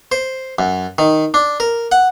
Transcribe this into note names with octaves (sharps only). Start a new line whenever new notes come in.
C5
F#2
D#3
D4
A#4
F#5